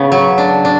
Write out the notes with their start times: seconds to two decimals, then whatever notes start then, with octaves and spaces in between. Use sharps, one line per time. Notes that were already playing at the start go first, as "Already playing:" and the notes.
Already playing: C#3 B3 B4
0.12 F#3
0.38 D4
0.65 D4